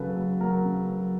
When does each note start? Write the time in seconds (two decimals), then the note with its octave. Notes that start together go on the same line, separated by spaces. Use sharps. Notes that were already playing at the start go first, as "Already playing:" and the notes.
Already playing: C#3 F#3 A4 B4
0.16 F#3
0.41 F#3 A#4
0.65 C#3
0.89 F#3